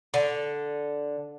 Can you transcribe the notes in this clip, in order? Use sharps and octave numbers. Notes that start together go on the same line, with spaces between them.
D3